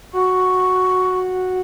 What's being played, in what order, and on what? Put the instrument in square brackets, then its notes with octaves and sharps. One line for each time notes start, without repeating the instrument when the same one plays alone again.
[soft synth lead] F#4 [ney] C#6